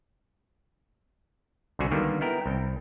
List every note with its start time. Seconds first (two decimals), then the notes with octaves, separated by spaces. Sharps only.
1.79 C2 D3 F#4 G#5
1.92 D3 D#3 G3 A#3 B3
2.21 B3 E4 A#4 G5
2.41 C2 G5